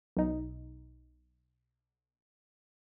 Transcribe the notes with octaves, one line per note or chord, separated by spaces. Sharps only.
B1 D#4